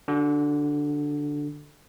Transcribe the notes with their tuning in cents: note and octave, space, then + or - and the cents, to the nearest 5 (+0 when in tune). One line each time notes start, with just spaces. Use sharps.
D3 +0 F#4 +15